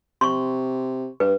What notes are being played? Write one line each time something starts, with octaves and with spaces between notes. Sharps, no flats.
C3 C6 C#6
G2 B4